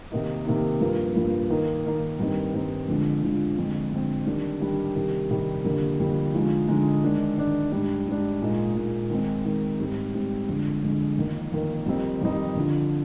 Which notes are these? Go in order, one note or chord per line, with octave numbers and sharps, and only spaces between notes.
C3 D#3 A#3 D#4
C3 D#3 A#3 D#4
G2 F3 A#3
G2 F3 A#3
D#3 A#3 D#4
D#3 A#3 D#4
G2 D#3 G3 C4 D#4
G2 D#3 G3 C4 D#4
F2 D3 F3 G#3
F2 D3 F3 G#3
F2 D3 G#3 C4
F2 D3 G#3 C4
D#3 G3 D4
D#3 G3 D4
C3 D#3 G3
C3 D#3 G3
F2 D3 G3 A#3
F2 D3 G3 A#3
D3 F3 G#3 D#4
D3 F3 G#3 D#4
D#3 G#3 D4
D#3 G#3 D4
G#2 G3 D4
G#2 G3 D4
A#2 G#3 D#4
A#2 G#3 D#4
D#3 G#3 C4 D#4
D#3 G#3 C4 D#4
G#2 G3 C4
G#2 G3 C4
F2 D3 G#3
F2 D3 G#3
F2 D#3 A#3
F2 D#3 A#3
F2 D#3 G3 C4 D#4
F2 D#3 G3 C4 D#4
F2 D3 F3